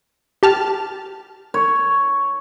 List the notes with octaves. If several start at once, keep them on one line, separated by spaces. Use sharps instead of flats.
G4 A5 F6
C#5